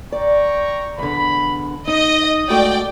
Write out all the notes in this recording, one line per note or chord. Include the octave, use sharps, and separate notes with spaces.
D5 G5 A#5 C#6
E2 D3 B5
D#4 D#5 D#6
G#3 A3 F#4 D5 G5